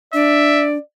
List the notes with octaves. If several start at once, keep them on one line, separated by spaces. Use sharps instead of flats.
D4 D5 E5